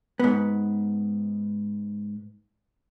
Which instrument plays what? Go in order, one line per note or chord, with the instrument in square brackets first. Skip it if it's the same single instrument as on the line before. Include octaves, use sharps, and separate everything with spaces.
[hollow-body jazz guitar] G#2 B3